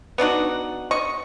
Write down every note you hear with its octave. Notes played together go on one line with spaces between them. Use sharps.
B3 D4 D#4 F#4
D#5 C#6